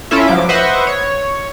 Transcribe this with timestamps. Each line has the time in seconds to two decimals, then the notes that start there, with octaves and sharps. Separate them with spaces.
0.11 C#4 E4 F4 A4 E5
0.28 F3 F#3 D6
0.49 B4 C5 D#5 E5 F#5 C#6
0.87 C#5